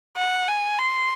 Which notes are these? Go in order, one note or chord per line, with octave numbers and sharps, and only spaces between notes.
F#5
G#5
C6